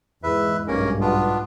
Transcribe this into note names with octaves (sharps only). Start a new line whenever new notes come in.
E2 G#2 B4 E5
B1 G2 A#3 C#4 A#4
B3 D4 F4